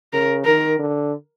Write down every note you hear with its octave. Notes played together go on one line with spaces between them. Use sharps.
C#3 A#4
D#3 A#4
D3